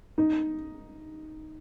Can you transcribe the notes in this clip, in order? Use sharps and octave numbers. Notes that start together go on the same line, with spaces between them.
D#4